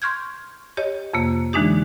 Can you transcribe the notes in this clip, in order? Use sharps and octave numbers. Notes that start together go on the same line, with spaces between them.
C6 C#6 F6 G6 G#6
G4 C#5 D#5
F2 C3 A#3
D3 E3 G#3 D4 D#4 G4